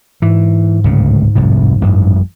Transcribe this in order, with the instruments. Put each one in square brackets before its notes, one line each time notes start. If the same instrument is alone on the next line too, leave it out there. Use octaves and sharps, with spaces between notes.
[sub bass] G#2 [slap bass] E3
[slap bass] D1 C#2 C#3
F1 C2 A2
A1 F#2 G#3